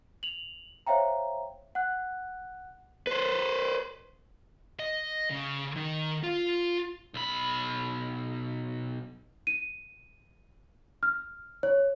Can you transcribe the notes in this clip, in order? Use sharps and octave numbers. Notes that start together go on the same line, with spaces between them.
F7 F#7
C5 C#5 E5 F5 G5 A#5
F#5 F#6
B4 C5
D#5
C#3
D#3
F4
B1 B5
D#7
F6
C#5